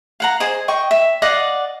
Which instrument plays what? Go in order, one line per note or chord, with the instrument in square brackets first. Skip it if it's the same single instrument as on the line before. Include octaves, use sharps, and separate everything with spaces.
[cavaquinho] F5 F#5 A#5
G#4 C5 D#5
D#5 G5 C#6
E5
D5 D#5 F5 F#5